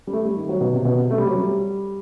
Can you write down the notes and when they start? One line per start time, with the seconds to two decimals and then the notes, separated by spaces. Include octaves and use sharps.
0.07 G3
0.13 A3
0.25 G3
0.36 D#3
0.49 F#3
0.61 B2
0.74 C3
0.85 B2
0.98 C3
1.11 A3
1.18 G3
1.27 F#3
1.35 G3